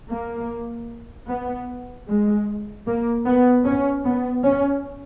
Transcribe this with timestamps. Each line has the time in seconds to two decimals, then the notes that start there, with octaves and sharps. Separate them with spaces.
0.09 A#3
1.28 B3
2.07 G#3
2.86 A#3
3.26 B3
3.65 C#4
4.04 B3
4.44 C#4